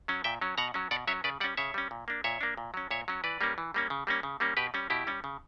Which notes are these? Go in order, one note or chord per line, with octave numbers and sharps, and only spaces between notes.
F#3 C#4
A#2 E5 G5
F#3 C#4
B2 F#5 A#5
F#3 C#4
B2 D5 F#5
F#3 C#4 C#5 E5
C#3 B4 D5
G3 C#4 D5 F#5
C#3 C#5 E5
G3 C#4
A#2
A#3 D4
A#2 C#5 E5
A#3 D4
A#2
F#3 C#4
A#2 C#5 E5
F#3 C#4
E3 B4 D5
G3 A#3 C#4
E3
G3 A#3 C#4
C#3
G3 A#3 C#4
C#3
G3 A#3 C#4
B2 G4 B4
G3 C#4
B2 E4 G4
G3 C#4
C#3